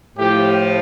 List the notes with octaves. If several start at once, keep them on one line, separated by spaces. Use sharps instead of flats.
A2 F3 G4